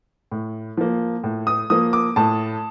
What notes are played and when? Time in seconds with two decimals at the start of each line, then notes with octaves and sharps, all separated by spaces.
0.32 A2
0.77 F3 A#3
1.24 A2
1.47 D#6
1.70 F3 A#3 D#6
1.93 D6
2.16 A2 A5